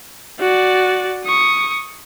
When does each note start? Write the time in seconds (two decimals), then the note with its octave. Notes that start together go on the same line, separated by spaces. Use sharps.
0.40 F#4 D5
1.25 C#6 D#6